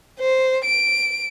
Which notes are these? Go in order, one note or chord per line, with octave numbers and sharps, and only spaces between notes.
C5
D7